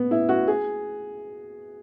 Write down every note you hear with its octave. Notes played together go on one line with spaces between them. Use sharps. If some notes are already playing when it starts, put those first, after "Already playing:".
Already playing: B3
E4
F#4
G#4